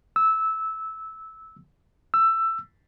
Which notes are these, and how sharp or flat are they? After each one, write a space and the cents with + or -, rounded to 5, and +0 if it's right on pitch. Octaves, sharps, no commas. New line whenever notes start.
E6 -15
E6 +15